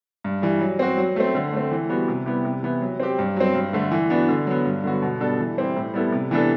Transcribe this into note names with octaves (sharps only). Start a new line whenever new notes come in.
G2
E3 G3
F#3
C4 F#4
F#3
A3 C4
D3
A3 C4
E3
G3 B3 F#4
C3
G3 B3 E4 G4
C3
E3 B3 E4
F#3
C4 G4
G2
F#3 C4
G2
D3 A3
E3
B3 D4 F#4
D3
F#3 B3
G2
D3 F#3 B3 F#4
B2
G3 B3 D4 A4
E3
G3 C4 E4 G4
A2
G3 B3 E4 A4
C3
E3 B3 D4 A4